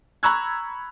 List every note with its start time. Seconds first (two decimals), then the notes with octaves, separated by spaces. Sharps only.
0.23 A#5 B5 C#6 E6 F#6 G#6